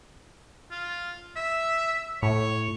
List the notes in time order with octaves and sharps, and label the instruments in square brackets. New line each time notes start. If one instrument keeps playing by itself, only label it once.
[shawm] F4
E5
[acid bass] A2 [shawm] C#5